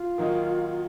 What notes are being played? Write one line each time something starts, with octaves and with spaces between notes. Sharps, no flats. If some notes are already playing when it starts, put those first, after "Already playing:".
Already playing: F4
D#3 F#3 A#3 D#4